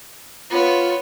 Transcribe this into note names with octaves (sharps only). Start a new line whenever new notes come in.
B3 F4 C#5